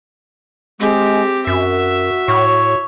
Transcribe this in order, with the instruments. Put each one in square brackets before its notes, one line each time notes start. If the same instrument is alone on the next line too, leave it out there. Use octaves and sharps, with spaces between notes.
[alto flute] G#3 [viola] C4 G4
[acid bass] F#2 [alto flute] F#4 [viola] E5
[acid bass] A2 [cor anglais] C#5